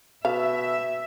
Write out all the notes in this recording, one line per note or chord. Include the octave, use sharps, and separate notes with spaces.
B2 E5 F5